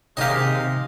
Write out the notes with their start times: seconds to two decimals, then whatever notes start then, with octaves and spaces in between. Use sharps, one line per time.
0.17 C3 D#3 G#3 A#3 D#4 G4 D#5 F5